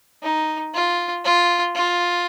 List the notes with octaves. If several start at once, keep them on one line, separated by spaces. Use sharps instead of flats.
D#4
F4
F4
F4